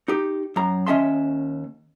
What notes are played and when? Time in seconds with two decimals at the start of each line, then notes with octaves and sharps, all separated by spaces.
0.08 D#4 G4
0.56 F#2 A#5
0.87 D#2 C#4 D#5 E5 A5 C6